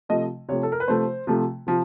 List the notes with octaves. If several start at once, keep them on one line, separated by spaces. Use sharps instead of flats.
C3 F3 A3 D#5
C3 F3 A3 C#5
A4
A#4
B4
C3 F3 A3 C5
C3 F3 A3
C3 F3